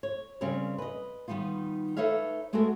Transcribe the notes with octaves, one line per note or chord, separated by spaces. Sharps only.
C#5
C#3 G3 C4 A#4 C#5
B4 D#5
D#3 G3 B3 D#4 F4
D#4 A4 B4 C#5 E5 F5
G#3 A3 B3 F#4 A4 A#4